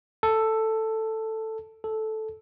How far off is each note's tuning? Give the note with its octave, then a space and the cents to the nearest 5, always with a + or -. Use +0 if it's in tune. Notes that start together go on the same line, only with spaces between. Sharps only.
A4 +5
A4 -10